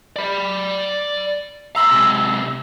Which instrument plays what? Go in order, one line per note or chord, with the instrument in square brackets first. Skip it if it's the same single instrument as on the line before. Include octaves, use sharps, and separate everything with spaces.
[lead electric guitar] D5 B5
[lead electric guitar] A#5 C6 [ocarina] E6
[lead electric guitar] C3 G#3